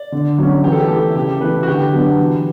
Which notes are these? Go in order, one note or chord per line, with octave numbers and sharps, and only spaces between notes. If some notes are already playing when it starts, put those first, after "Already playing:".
Already playing: D5
D3
F#3 C#4
E3 G4
A4
G4
A3 E4
C#3 G4
E3 A3 E4 B4
F#4
D3 G4
F#3 B3 D4
E3